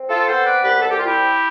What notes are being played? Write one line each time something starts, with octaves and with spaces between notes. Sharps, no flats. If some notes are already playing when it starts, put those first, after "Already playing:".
Already playing: C4
F4 A4
B3 A4 C5
B4 D5
C2 G4 B4
A4
G4
C4 F4
E4 G4